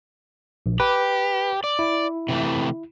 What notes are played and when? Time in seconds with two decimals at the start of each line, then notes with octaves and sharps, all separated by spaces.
0.66 A#1
0.80 G4 B4
1.64 D5
1.79 E4
2.28 C3 E3 A3